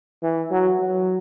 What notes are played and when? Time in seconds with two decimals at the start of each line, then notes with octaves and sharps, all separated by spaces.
0.23 E3
0.51 F#3
0.79 F#3